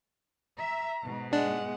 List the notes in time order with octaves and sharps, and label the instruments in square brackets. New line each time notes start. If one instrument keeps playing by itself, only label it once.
[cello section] E5 [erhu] A#5
[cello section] G#2 B2
[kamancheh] G#3 [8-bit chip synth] D4 [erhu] F#5